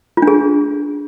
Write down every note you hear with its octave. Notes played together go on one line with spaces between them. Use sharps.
F4
D4
G#4